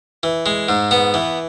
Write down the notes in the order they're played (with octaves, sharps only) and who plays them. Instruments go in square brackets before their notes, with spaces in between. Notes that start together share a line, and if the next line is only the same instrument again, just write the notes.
[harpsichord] E3
G#3
G#2
B3
E3